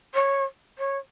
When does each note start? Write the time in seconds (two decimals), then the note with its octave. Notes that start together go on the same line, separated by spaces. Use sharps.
0.14 C#5
0.78 C#5